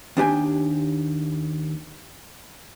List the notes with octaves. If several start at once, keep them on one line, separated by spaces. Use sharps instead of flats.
D#2 D4 G4 G#5